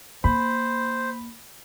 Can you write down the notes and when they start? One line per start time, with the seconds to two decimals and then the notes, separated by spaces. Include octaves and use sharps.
0.24 A#3 C5 B5